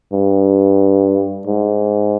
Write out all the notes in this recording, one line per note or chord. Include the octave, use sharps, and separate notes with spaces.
G2
G#2